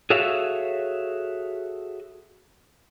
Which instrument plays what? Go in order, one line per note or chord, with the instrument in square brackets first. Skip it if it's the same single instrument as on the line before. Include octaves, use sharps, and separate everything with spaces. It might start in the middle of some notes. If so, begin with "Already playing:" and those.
[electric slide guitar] F#4 G#4 A4 C#5 E5 F5